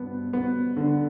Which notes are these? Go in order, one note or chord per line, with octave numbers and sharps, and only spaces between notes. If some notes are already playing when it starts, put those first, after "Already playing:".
Already playing: G2 B3
B3
D3